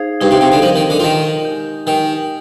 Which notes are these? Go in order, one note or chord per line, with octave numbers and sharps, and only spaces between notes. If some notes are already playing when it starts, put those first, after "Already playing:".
Already playing: D#4 G#4 C5 F5
G2 D#4 G#4 C5 F5
C3
C3
D3
F3 D#4 A#4 D#5
D#3
D3
F3
D#3 D#4 A#4 D#5
G#3 D#4 G4
D#3 G#3 D#4 G4